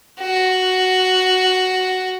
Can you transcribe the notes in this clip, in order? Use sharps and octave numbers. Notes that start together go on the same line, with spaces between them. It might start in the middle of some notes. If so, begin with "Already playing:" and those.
F#4